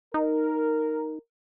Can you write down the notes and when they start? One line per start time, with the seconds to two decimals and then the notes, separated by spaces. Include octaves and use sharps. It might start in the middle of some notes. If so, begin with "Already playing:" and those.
0.14 D#4 A#4